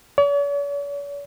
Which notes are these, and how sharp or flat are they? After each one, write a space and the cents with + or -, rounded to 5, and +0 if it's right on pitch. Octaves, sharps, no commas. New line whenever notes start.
C#5 +45